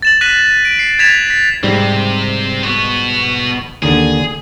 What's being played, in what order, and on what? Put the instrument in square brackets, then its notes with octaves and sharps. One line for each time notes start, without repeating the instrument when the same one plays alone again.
[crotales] A6 E7 F#7
F#6 A#6 B6 D#7 E7 F#7
D7
C7
G#6 A6 B6 E7 F7
B6
[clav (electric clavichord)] G#2 G3 [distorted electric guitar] C3 C4
[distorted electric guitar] B3 F#4
[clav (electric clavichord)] D#2 D3 [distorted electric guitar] G#4